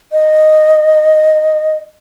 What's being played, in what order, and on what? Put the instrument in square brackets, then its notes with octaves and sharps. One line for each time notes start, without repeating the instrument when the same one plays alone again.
[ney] D#5